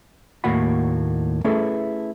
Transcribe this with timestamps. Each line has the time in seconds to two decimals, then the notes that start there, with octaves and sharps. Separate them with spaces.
0.44 D#2 A2 A#3 F#4 F#5 B5
1.44 A3 C#4 E4 G#4 A4 B4